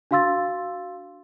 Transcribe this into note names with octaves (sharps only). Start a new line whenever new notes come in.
D4 F#4 F5 C6 E6 A6